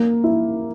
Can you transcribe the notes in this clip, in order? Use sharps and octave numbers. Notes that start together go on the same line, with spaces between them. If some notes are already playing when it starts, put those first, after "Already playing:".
Already playing: A#3
E4